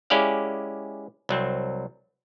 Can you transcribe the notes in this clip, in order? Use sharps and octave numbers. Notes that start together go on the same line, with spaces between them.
G#3 C#4 E4 G4 D5 F5
C2 F#3 C4